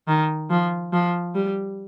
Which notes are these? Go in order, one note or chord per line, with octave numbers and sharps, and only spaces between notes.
D#3
F3
F3
G3